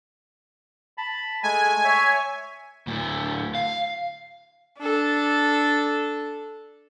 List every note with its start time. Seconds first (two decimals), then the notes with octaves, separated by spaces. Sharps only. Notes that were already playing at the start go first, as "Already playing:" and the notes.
0.98 A5 B5
1.43 G#3 A3 G#5
1.84 C#5 E5
2.87 D2 A2
3.55 F5
4.79 D4 A4